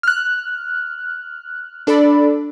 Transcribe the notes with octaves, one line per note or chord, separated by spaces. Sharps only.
F6 F#6
D4 A4 D5 B5